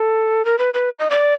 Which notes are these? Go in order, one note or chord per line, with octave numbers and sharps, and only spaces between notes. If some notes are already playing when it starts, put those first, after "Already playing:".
Already playing: A4
A#4
B4
B4
D#5
D5